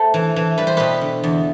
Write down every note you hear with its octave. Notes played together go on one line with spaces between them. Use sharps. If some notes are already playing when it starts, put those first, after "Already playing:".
Already playing: A3 A4 C5
E3
E3
G3 B4
C5
B2 G4 B4
D3
E2